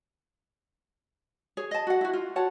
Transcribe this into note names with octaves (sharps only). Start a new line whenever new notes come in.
G#4 C#5
D#5 A5
F#4 F#5
E4 F#4
F4
F#4 C#5 F#5 A5